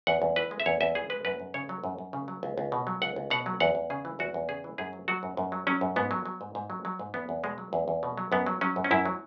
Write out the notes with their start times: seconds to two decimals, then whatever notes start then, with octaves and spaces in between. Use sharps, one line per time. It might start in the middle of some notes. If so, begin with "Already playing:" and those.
0.07 E2 F#5
0.22 E2
0.36 E3 B4
0.51 G#3
0.60 E5
0.66 E2 C#5
0.81 E2 E5
0.95 E3 G#4
1.10 G#3 B4
1.25 F#2 B4
1.40 F#2
1.54 C#3 C#5
1.69 F#3
1.84 F#2
1.98 F#2
2.13 C#3
2.28 F#3
2.43 C#2
2.58 C#2
2.72 B2
2.87 F#3
3.02 C#2 F#5
3.16 C#2
3.30 B2 F#5
3.46 F#3
3.60 E2 F#5
3.75 E2
3.90 C#3 G#4
4.05 E3
4.19 E2 F#4
4.34 E2
4.49 C#3 G#4
4.64 E3
4.78 F#2 G#4
4.93 F#3
5.08 F#3 F#4
5.23 F#2
5.37 F#2
5.52 F#3
5.67 F#3 C#4
5.81 F#2
5.96 G#2 B3
6.11 F#3
6.26 F#3
6.41 G#2
6.55 G#2
6.70 F#3
6.85 F#3
6.99 G#2
7.14 E2 B3
7.29 E2
7.43 B2 G#3
7.58 F#3
7.73 E2
7.88 E2
8.03 B2
8.17 F#3
8.32 F#2 B3
8.46 F#3
8.61 F#3 C#4
8.76 F#2
8.84 C#4
8.91 F#2 E4
9.05 F#3